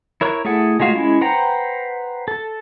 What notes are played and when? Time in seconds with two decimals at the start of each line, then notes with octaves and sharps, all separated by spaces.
0.21 E4 A#4 C#5 F#6
0.45 A3 E4 G#4 A4 F#5
0.80 G#3 A3 F4 F#4 F5
0.95 G#3 C#4 E4
1.21 B4 C5 F#5 G5 A#5
2.28 A4